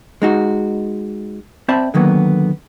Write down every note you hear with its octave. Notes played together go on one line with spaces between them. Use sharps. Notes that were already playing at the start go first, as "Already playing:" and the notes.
G#3 D#4 F#4
C4 C5 D5 E5 A5 B5
D3 D#3 F#3 A#3 B3